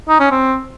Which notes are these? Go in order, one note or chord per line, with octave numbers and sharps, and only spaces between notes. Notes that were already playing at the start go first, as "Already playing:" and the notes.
D#4
C#4
C4